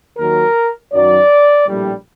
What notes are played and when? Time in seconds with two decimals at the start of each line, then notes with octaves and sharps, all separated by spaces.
0.17 D#2 D#3 F#3 A#4
0.92 F#2 D#3 F#3 D5
1.67 A#1 A2 G3